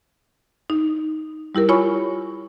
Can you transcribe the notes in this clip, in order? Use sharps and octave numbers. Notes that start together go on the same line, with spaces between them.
D#4
G3 E4 G4 A#4
E4 F4 C#5 G#5 B5 C#6